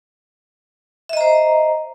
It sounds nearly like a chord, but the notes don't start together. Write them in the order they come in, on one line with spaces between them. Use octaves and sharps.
E5 D#5 A#5 C5